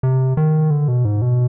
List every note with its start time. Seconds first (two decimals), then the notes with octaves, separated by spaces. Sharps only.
0.03 C3
0.37 D#3
0.71 D3
0.88 B2
1.05 G#2
1.22 B2